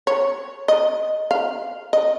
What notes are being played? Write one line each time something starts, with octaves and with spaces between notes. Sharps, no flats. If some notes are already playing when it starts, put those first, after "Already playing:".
C#5
D#5
F5
D#5